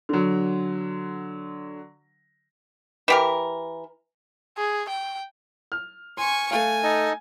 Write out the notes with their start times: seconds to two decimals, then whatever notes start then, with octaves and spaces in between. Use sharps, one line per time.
0.09 D3 F#3
3.08 E3 G4 A#4
4.57 G#4
4.89 G5
5.72 F6
6.17 G#5 C6 C#6
6.51 A3 F5 G#5
6.83 D#4 A4 D#5